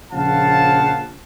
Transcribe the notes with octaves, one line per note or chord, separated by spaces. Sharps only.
A#1 C#3 F3 F5 F#5 A5